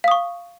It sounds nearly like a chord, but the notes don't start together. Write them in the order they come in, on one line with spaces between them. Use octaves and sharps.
F5 D#6 C#6